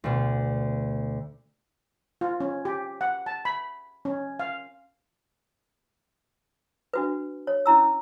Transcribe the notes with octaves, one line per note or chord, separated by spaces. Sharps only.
D2 B2
F4
C#4
G4
F#5
A5
B5
C#4
F5
D4 F#4 B4
C#5
C#4 E4 A#5 E6